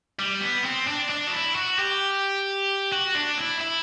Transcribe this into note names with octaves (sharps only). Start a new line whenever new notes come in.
G3
B3
C4
D4
D4
F#4
E4
F#4
G4
F#4
D4
E4
E4